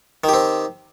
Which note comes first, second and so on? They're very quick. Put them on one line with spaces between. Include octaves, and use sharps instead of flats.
D#3 G4 C4